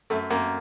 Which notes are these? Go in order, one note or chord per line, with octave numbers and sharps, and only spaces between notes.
F#2 A3
F#2 A#3